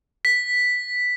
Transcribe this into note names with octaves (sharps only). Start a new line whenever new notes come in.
B6